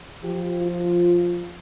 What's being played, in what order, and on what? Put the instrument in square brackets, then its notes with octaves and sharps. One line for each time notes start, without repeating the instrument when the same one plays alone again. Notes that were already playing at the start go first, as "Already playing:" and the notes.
[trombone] F3 [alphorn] G4
[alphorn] F4